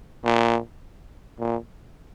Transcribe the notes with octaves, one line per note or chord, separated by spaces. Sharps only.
A#2
A#2